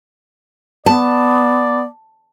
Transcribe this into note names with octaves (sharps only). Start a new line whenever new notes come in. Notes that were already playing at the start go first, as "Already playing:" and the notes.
B3 D5 A5